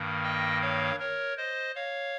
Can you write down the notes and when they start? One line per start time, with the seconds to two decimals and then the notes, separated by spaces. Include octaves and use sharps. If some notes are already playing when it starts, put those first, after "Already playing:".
Already playing: G2 D#3 A#3
0.23 D#5 G5
0.62 C#5 F5
0.99 A#4 C#5
1.37 C5 D#5
1.75 C#5 F5